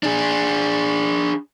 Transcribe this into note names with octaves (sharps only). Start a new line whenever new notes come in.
D4 G#4